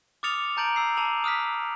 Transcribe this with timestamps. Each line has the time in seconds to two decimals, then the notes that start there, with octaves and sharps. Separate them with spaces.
0.23 D6 D#6 F6 A6 C#7 F7
0.57 A5 A#5 G6 A6 D7 F#7
0.76 E6 C7
0.97 A5 B5 D6 F7 F#7
1.24 D#6 F6 F#6 B6